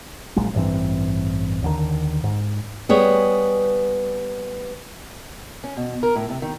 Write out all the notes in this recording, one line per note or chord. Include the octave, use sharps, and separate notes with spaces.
A#1 A#2 F#3 G#3
A1 G2 E3 C4
D#2 D3 D#3
G#2
G3 B3 G#4 C#5
C#4
B2
A#4
A2
C3
D#3